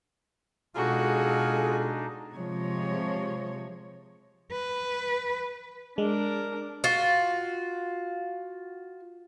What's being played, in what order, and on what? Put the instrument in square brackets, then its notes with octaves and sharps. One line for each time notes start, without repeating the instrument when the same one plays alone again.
[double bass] B2 G#3 [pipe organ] D4 D#4 [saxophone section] F4 G#4 A4 [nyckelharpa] F#4
[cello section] C3 F3 G#3 C#5
[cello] B4
[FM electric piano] G#3 [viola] D4 A#4
[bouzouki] F4 F#4